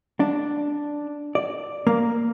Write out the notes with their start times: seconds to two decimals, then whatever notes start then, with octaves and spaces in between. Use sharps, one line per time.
0.20 D4
1.35 D5
1.87 A#3